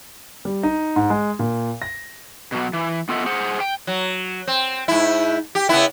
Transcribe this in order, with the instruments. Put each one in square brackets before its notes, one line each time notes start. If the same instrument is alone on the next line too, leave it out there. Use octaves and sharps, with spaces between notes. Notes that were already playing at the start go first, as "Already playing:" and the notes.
[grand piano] G3
D#4
G#2
G#3
A#2
A#6
[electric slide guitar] B2 F#3
E3
B3 F4 A4 D#5 E5 F#5
G#4 C5 F#5
G5
[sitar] F#3
C4
G#2 E4
G4
C#3 B3 E4